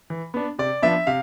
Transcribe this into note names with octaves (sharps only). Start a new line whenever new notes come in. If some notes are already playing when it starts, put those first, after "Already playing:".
E3
B3 D4
C3 D5
F3 B3 D4 E5
C3 F5